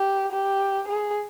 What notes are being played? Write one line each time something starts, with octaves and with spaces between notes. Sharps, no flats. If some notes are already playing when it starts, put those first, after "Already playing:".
Already playing: G4
G4
G#4